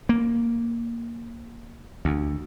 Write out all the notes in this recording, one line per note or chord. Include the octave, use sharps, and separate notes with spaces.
A#3
D2